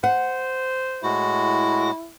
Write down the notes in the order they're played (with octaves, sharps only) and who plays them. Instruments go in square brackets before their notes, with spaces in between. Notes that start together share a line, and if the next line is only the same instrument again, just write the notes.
[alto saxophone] C5 [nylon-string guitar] F#5
[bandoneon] A2 G#3 F#4 [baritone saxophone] E4